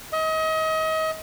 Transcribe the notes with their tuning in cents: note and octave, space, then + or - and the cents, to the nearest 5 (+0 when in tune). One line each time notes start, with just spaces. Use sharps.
D#5 +35